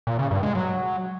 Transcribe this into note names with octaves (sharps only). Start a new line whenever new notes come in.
A#2
C#3
G2
G#3
F#3